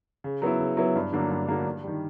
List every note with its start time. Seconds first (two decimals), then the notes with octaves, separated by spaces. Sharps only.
0.24 C#3
0.42 F#3 B3 E4
0.60 C#3
0.77 F#3 B3 E4
0.95 G2
1.13 D3 F#3 A#3 D4
1.30 G2
1.47 D3 F#3 A#3 D4
1.66 G2
1.83 D#3 G3